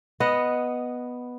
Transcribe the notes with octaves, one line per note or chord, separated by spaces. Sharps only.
B3 D#5 F#5